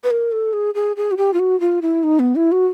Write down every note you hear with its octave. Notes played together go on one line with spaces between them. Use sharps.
B4
A#4
A4
G#4
G#4
G#4
F#4
G4
F4
F#4
F4
E4
D#4
B3
E4
F#4